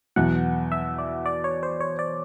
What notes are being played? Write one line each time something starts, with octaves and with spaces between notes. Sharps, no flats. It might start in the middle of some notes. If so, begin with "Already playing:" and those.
E2 B2 F#3 F#5
E5
D5
D5
C#5
C5
C#5
D5